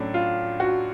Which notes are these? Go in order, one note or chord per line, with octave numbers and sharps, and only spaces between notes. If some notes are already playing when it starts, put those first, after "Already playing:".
Already playing: A2 F#3 A3 C#4 D4
F4
F#4